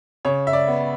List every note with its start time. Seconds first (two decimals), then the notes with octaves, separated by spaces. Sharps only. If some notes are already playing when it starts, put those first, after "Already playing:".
0.25 C#3 C#5
0.47 E5
0.53 D5
0.68 B3